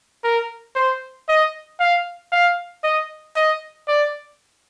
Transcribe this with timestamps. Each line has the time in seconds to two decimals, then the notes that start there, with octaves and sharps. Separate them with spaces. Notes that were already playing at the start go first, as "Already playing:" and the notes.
0.24 A#4
0.76 C5
1.29 D#5
1.80 F5
2.32 F5
2.84 D#5
3.36 D#5
3.88 D5